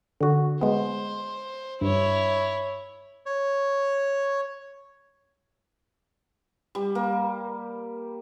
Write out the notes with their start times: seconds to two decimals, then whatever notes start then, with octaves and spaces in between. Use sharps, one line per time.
0.21 D3 F#4
0.61 G#3 B3 C5
1.81 G2 E4 C#5
3.26 C#5
6.75 G3
6.95 A#3